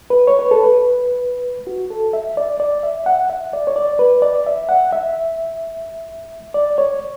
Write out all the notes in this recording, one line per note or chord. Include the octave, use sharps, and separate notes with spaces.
B4
C#5
B4
A4
B4
F#4
A4
E5
D5
D5
E5
F#5
E5
D5
C#5
D5
B4
D5
E5
F#5
E5
D5
C#5